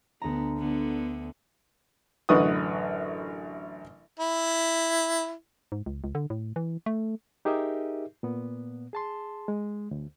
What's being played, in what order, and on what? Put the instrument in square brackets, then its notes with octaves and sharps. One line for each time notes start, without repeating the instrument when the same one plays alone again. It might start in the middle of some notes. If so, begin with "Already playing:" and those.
[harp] D2 A#5 [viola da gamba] B3
[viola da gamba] D3 B3
[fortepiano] A1 F#2 D3 B4 C#6 D#6
[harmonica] E4
[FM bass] G#2
C#2
C#2
D3
A2
E3
A3
[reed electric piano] D#4 G4 G#4 A#4 D#5 E5
A#2 B3
G#4 A5 C6
G#3
D2